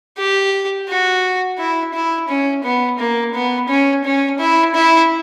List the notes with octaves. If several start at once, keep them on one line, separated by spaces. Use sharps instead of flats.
G4
F#4
E4
E4
C#4
B3
A#3
B3
C#4
C#4
E4
E4